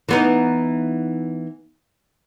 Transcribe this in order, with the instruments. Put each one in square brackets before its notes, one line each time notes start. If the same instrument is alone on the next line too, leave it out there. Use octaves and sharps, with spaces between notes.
[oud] E3 B3 D#4